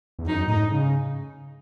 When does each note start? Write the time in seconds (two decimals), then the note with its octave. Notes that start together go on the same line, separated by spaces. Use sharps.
0.19 E2
0.27 F#2 D#4
0.47 A2 D#4
0.55 G#2
0.70 C#3